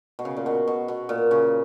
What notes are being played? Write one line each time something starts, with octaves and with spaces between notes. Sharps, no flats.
B2
C#3
A#2
B2
B2
B2
A#2
C#3